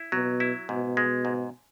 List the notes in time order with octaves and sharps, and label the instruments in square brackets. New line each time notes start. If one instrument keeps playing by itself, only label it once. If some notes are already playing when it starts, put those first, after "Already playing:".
Already playing: [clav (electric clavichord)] E4
[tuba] B2 [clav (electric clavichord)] F#3
[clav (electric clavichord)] E4
[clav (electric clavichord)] G#2 [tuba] B2
[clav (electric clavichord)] G#3
G#2